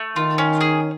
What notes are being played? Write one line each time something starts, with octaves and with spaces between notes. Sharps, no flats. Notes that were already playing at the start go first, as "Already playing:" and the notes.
Already playing: A3
D#3 F4
C#4
G#4